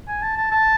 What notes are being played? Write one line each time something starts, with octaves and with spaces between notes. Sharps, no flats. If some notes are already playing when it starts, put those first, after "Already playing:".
G#5
A5
A5
A5